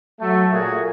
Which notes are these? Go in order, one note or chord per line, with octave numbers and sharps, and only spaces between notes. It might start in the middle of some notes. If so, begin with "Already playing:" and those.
F#3 A3
A#2 A3 A#3 F#4 G#4